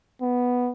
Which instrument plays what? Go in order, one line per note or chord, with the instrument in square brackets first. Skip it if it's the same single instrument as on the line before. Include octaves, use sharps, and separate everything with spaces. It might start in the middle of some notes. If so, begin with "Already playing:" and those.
[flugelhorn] B3